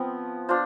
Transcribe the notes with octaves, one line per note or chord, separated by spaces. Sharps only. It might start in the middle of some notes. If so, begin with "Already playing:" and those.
Already playing: F3 B3 C4
D4 F4 C5